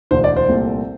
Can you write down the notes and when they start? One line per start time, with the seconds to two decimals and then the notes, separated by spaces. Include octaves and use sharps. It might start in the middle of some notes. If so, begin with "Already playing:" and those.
0.11 E1 D2 D3 C5
0.24 D5
0.36 C5
0.48 C2 A#2 A3 C4